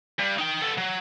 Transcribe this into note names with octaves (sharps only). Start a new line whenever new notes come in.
G2
D#4 G5
B3 A4
F#3